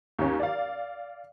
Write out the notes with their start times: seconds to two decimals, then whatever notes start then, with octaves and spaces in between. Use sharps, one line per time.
0.19 D#2 C#4
0.40 D5 F5